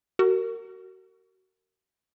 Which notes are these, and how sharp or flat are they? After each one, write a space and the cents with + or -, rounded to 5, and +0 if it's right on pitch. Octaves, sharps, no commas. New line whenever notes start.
F#4 +30 A#4 -25